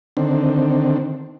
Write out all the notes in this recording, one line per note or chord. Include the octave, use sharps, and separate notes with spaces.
D3 D#3 C4